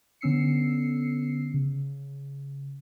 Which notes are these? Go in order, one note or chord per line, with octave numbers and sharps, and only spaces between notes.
D3 B3 C#4 E6 C7 C#7
C#3